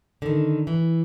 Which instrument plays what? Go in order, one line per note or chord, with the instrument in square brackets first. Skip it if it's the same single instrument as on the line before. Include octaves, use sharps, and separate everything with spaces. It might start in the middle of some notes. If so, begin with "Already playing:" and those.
[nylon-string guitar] D3 D#3
E3